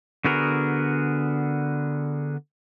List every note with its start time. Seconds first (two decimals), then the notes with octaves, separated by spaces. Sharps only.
0.25 D3 B3 F#4 G#4 A#4